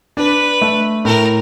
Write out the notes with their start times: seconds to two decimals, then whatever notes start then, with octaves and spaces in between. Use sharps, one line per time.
0.17 D4 B4
0.62 A3
1.05 A2 A#4